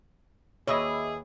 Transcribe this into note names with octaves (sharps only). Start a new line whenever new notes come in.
D#2 G#4 B4 C#5 D#5 E5 D6